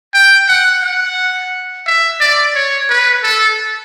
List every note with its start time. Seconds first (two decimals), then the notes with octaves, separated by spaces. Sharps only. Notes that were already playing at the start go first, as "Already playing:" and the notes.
0.14 G5
0.49 F#5
0.83 F#5
1.86 E5
2.21 D5
2.55 C#5
2.90 B4
3.24 A4